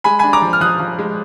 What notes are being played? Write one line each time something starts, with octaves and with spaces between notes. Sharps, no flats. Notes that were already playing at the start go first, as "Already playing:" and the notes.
G#3 G#5 B5
D4 G#5 B5
A#5 D6
F3
F6
F3 D#6 F#6
F3
G#3